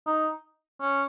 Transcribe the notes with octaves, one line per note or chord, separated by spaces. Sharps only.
D#4
C#4